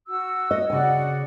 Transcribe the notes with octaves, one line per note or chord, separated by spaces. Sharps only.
F#4 E6
D#5
C#3 F#4 D5 F#5 G#5